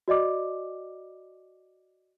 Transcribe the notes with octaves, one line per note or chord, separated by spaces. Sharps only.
F#4 D5 D#5 D6